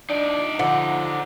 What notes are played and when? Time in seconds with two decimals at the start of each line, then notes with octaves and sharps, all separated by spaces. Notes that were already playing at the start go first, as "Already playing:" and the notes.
0.10 D4 D#4 D5
0.59 D3 F3 F#5